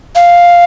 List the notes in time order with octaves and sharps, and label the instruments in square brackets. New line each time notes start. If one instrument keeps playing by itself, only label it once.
[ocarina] F5